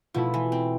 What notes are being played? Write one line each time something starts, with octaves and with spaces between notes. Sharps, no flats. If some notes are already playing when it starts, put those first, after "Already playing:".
B2 F3 A3 E4
E3
C4